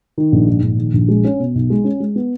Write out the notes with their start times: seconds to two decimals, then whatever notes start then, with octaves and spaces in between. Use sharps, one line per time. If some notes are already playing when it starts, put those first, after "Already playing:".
0.18 D#3
0.32 A#1
0.48 G#2
0.62 A#1
0.78 D#3
0.93 A#1
1.08 G#3
1.24 C#4
1.39 B2
1.55 B1
1.70 G#3
1.84 C#4
2.00 G#3
2.16 B3